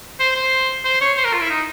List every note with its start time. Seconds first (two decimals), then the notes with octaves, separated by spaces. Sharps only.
0.20 C5
0.36 C5
0.85 C5
1.01 C#5
1.17 C5
1.25 A#4
1.33 F4
1.41 E4
1.50 D#4